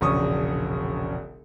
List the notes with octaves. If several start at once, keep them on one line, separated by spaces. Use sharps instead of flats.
E1 A#1 C#3 C#6 D#6